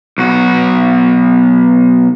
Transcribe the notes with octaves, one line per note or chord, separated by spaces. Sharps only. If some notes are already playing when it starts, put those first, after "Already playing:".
B1 F#4